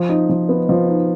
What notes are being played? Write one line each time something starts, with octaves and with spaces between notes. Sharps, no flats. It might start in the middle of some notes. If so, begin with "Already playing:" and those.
Already playing: F3
D#4
F3
B3
F3
D#4